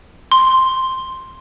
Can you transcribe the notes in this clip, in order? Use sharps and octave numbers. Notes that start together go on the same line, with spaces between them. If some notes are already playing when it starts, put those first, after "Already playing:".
C6